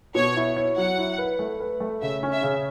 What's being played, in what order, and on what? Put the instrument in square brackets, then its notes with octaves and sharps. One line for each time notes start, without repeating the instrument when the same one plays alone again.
[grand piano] B2 [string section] C#5
[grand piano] E4
C#5
[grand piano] F#3 [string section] F#5
[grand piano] E4
B4
A3
B4
A3
[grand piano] C#3 [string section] E5
[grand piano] C#4
[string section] E5
[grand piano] C#3